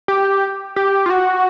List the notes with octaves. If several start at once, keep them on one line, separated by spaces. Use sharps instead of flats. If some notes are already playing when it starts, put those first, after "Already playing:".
G4
G4
F4
F#4